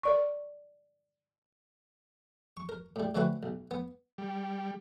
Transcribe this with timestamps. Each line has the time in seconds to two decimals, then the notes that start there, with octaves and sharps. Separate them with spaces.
0.03 A#4 D5 C#6
2.57 C#6
2.69 A#4
2.96 A2 G3
3.15 D3 A3 C4 C#4 F#4 B4
3.43 B1
3.71 B3
4.18 G3